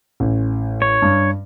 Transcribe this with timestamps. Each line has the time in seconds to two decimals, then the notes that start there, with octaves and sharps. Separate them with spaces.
0.20 A1
0.82 C#5
1.02 G2